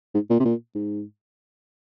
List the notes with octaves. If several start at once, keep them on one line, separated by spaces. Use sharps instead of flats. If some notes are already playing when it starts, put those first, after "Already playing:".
G#2
A#2
C3
A#2
G#2